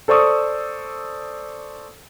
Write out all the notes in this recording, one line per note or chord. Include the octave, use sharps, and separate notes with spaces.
A4 C5 D5 C#6 D#6 E6